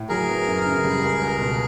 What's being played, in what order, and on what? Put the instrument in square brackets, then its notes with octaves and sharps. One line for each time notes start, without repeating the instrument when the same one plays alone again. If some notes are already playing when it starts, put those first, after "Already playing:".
Already playing: [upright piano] A2
[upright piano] F#3 [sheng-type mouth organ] G#4 A#4
[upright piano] B3
F#2
C#3
G3
C#2
C#2
B2